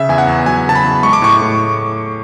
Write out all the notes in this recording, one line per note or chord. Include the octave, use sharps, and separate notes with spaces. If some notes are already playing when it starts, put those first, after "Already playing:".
Already playing: C#3 E5
E2 G#5
F#5
E2
F#3 G#5
C#3 A5
B5
E2
G#3 C#6
D6
A2 C#6
A2